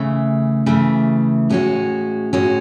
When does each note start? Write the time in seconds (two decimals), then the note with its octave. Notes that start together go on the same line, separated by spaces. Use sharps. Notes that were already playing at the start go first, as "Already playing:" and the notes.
Already playing: C#3 E3 A3
0.66 C#3 E3 A3
1.49 A2 G#3 C#4 F#4
2.33 A2 G#3 C#4 F#4